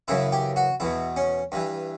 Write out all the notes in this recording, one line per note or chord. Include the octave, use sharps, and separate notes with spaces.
F#2 C#3 E3 E4
G4
F#4
E2 B2 E4
C#4
G2 E3